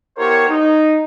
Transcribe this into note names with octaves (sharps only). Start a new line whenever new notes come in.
B3 E4 G4 A#4 C5 C#5
D#4